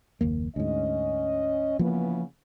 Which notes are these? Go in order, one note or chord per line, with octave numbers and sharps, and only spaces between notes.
F#1 D#2 A#3
D2 G#2 C#4 D#5
C#3 E3 F3 A#3 B3